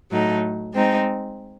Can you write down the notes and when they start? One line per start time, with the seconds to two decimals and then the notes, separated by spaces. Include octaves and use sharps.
0.11 A2 F#3 A3 D#4
0.74 G#3 C4 D#4